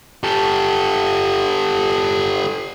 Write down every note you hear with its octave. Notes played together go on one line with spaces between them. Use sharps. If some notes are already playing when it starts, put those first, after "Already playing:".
G4 A4